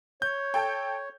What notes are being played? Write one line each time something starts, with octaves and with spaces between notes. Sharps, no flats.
C#5 G6
A4 G5